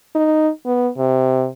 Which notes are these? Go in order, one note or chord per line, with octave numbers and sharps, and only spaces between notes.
D#4
B3
C3